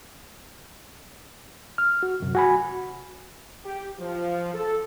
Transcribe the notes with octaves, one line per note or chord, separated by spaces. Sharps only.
F6
F#4
C2 F#2 C3
F#4 G#5 B5
G4
F3
A4